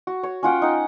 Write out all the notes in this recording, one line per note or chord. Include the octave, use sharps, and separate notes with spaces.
F#4
C#5
C#4 F4 F#5 G5
D#4 F#5